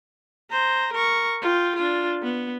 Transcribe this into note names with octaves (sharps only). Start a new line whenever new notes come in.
C5 A#5
A#4 C#6
F4 G5
D4 F4
B3